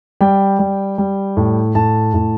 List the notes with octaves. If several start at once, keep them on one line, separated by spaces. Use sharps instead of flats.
G3 G5
G3
G3
A2
A2 A5
A2